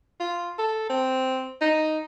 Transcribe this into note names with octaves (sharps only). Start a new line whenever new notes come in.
F4
A4
C4
D#4